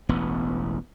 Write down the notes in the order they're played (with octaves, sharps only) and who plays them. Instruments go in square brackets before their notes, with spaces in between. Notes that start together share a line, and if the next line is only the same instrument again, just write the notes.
[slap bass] E1 A1 B3